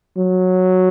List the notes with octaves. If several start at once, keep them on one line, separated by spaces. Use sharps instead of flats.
F#3